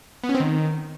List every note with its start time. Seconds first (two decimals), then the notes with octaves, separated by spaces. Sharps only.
0.24 B3
0.29 C#4
0.35 C4
0.40 D#3